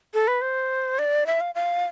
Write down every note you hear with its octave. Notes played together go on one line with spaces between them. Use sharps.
A4
B4
C5
D5
E5
F5
F5